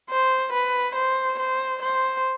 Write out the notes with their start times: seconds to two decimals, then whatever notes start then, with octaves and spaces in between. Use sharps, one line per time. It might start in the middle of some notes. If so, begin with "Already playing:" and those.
0.10 C5
0.53 B4
0.96 C5
1.39 C5
1.82 C5